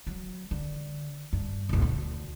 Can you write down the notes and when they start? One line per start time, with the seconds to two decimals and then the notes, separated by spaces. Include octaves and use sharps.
0.07 F#3
0.51 D3
1.33 G2
1.69 F1 B1
1.82 D2